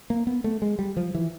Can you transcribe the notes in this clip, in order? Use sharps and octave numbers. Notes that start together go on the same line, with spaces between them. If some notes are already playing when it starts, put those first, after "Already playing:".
A#3
B3
A3
G#3
G3
F3
E3